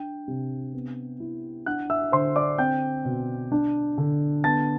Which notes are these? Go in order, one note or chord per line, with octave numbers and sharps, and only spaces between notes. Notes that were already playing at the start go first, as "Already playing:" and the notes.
Already playing: D4 G5
C3
B3
E4
D4 F#5 F#6
E5 E6
D3 C5 C6
D5 D6
C4 G5 G6
B2
D4
D3
B3 A5 A6